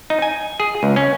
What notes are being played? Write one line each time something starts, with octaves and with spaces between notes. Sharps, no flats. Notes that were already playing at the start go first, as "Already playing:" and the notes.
D#4
G#5
G#4
C#2
C#4